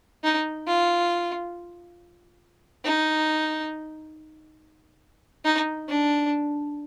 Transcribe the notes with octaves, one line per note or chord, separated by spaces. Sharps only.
D#4
F4
D#4
D#4
D4